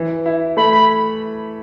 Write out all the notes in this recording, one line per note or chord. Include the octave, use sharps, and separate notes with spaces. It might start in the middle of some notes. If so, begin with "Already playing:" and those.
Already playing: E3
E4
A3 B5
B5